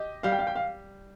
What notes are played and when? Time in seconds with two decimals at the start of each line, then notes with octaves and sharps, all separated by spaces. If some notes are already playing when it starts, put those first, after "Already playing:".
Already playing: G4 D#5
0.23 G3 F5
0.32 G5
0.39 F5
0.47 G5
0.55 F5